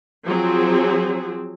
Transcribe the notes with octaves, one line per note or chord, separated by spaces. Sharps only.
F3 F#3 C4 G#4